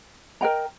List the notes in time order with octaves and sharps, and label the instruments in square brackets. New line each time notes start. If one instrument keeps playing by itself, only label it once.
[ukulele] A#4 D#5 G5 A#5